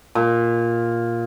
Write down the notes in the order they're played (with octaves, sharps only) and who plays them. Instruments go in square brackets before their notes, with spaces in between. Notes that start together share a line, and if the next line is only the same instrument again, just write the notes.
[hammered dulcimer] A#2